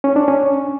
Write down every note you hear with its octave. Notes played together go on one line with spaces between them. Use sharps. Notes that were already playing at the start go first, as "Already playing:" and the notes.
C#4
D4
C#4